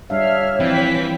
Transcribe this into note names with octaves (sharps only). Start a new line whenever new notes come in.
G3 D4 C#5 E5 F5 F6
E3 F3 C4 G5 B6